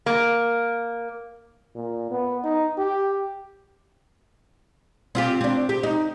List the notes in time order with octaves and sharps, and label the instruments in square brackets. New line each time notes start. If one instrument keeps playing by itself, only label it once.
[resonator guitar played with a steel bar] A#3
[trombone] A#2
B3
D#4
G4
[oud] C4 F4 G4
C4 D4
G4
D#4